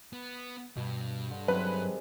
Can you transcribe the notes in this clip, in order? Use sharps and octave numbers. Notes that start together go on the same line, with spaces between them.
B3
G2 B2
D3
C3 D#3 F#3 G#3 B4